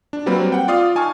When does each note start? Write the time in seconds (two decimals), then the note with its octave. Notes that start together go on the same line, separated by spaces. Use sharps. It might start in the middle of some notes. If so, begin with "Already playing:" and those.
0.13 D4
0.26 F#3 G3 A#3 C4 B4
0.52 F#5 G5
0.68 F4 D5 F5 D#6
0.95 D#4 G#5 A5 C#6 F6